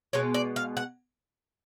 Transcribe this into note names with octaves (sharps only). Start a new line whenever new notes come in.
B2 G#3 B3 C#5
D5
F5
F#5